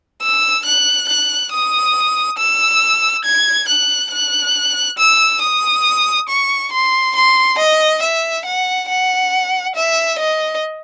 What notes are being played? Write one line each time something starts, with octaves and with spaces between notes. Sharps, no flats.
E6
F#6
F#6
D#6
E6
G#6
F#6
F#6
E6
D#6
C#6
C6
C6
D#5
E5
F#5
F#5
E5
D#5